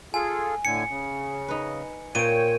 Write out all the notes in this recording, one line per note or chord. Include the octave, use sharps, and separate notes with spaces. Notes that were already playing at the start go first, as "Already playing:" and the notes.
F4 G#4 A4 G#5
A2 D3 G#5 C#7
C#3
D#4 B4
A#2 F4 C5 C#5 G5 D7 D#7